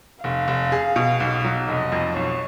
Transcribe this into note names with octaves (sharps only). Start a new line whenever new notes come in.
F1 F5
F1
G#4
B2
B1
F#3
F1 D#5
F2
B1 C#5